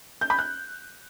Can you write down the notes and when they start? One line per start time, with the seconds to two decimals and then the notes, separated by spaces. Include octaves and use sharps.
0.21 G6
0.30 B5
0.39 F#6